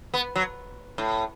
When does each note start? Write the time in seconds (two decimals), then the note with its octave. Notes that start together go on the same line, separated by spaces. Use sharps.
0.14 B3
0.36 F#3
0.98 A2